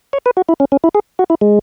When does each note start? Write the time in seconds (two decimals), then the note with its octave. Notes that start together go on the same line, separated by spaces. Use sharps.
0.13 C#5
0.26 B4
0.37 F#4
0.49 E4
0.60 C#4
0.72 C#4
0.84 E4
0.95 G#4
1.19 F#4
1.30 E4
1.41 G#3